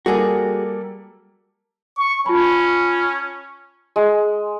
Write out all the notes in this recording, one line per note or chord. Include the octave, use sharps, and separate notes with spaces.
G3 A#3 F#4 G#4 A4
C#6
C#4 F4 A5 B5
G#3